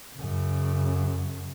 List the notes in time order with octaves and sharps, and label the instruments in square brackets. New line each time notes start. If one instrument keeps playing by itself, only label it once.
[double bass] F#2 C#3